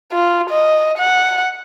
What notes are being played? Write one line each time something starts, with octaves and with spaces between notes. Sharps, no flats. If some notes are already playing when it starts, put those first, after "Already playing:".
F4
D#5
F#5